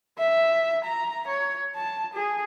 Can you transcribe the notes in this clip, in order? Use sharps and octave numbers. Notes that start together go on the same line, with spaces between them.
E5
A#5
C#5
A5
G#4